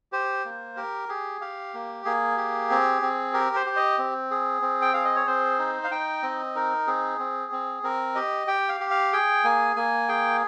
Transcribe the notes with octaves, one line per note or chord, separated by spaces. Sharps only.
G4 C5
A#3
G4 A#4
G4 G#4
G4 F5
A#3
A#3 G#4
G4
C4
C4
G4 A#4
C5
G4
D#5
C4
G#4
C4
G5
G#4 F5
D#5
C#5
C4 C5
D#4
F5
D#4 G5
C4 D#5
D#4 A#4
C4 G#4
C4
C4
C4 A#4
G4 D#5
G4 G5
F5
G4
F5
G#4 G5
A#3 G#5
A#3 G#5
G#4 G5